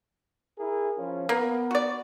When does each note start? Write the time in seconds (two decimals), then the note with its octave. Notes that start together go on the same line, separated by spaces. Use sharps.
0.58 E4 G#4 A#4
0.97 F3 C#4 F4
1.29 A#3 B3
1.71 F#4 D5